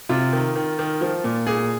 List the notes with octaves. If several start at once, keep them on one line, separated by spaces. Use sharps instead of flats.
C3 F4
D#3
D#3
D#3
F3
A#2
A#2 G#4